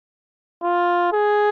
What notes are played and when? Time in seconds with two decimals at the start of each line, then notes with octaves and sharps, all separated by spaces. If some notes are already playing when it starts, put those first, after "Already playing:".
0.63 F4
1.12 G#4